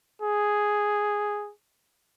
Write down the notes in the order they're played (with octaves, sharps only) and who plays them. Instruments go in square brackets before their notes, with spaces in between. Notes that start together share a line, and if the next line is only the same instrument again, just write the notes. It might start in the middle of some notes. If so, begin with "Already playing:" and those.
[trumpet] G#4